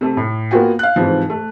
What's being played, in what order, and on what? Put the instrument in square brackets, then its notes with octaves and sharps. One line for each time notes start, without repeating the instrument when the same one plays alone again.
[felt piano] C3 A3
A2
A#3 B3 F4 F#4 G5 G#5
F5 F#6
G#2 C3 E3 F3
A3